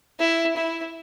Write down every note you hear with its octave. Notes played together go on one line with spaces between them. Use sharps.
E4
E4